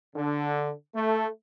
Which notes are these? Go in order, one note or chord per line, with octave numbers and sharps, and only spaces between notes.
D3
A3